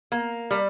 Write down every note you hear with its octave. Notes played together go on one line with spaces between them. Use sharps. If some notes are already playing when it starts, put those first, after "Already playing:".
A#3
G3